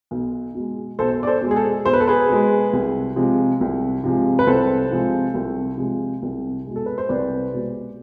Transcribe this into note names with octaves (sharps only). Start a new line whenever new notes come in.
B1
B2 G#3
B1 A4 C5
D5
A4 C5
B2 G#3
G#4
A4
B1 C5
B4
A4
G#4 B4
B2 G#3
C2
C3 F3 G#3
C2
C3 F3 G#3
B4
C2 A4 C5
C3 F3 G#3
C2
C3 F3 G#3
C2
B2 G#3
A4
B4
C5
C2 B4 D5
B2 G#3